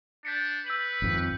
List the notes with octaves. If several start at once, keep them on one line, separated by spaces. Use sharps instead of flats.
D4 G6 B6 C#7
B4 E6 G6 F#7
G#1 F2